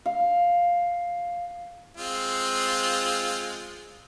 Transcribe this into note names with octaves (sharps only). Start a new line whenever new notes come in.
F5
G#3 C4 F4